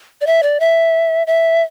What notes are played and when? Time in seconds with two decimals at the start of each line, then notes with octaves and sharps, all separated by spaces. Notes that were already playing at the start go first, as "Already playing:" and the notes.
0.21 D5
0.27 E5
0.43 D5
0.60 E5
1.27 E5